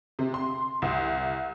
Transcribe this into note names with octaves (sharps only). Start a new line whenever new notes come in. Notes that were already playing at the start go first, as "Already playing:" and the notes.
C3
C6
C2